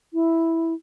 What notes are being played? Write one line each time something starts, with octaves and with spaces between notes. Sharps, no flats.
E4